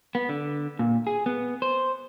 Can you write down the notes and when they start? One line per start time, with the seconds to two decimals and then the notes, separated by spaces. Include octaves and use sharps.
0.15 B3
0.29 D3
0.79 A#2
1.07 G#4
1.26 B3
1.62 C5